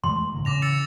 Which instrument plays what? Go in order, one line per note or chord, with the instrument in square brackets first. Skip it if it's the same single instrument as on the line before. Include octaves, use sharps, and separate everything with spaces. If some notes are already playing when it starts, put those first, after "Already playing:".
[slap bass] E3 G#3 A3 [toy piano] C6
[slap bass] A2 D3 A#3
[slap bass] C#3 E3 C#4 [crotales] D6 A#6 F7
[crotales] E6 A6 C#7